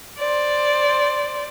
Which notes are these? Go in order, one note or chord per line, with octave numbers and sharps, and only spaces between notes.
C5 D5